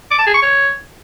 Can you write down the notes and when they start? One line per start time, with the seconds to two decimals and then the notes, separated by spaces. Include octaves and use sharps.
0.11 D6
0.19 A5
0.27 G#4
0.34 C#6
0.42 C#5